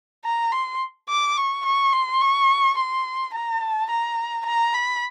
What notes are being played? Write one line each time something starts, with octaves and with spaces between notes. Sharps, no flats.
A#5
C6
D6
C#6
C#6
C6
C#6
C6
A#5
A5
A#5
A#5
B5